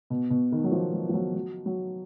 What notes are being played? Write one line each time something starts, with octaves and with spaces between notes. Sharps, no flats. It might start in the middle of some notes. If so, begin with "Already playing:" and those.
B2
B2
D#3
F#3
F3
F#3
F3
F#3
F#3
F#3